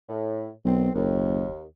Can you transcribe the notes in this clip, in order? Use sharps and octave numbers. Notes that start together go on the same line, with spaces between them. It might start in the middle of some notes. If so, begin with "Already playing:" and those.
A2
B1 D#3 C4
F#1 D#2